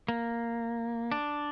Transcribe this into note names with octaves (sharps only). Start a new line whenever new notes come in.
A#3
D4